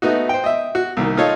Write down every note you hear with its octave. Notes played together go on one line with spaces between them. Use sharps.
A3 B3 D#4 F#4
C5 G5
D#5 E5
F#4
C2 D#3 A#3
D#4 F4 A4 C#5 D#5 F5